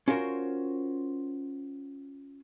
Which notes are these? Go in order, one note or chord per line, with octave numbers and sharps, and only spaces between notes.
C#4 F4 F#4 A#4 C5